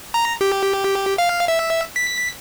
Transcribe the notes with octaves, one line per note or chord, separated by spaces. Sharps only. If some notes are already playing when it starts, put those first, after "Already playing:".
A#5
G4
F5
E5
B6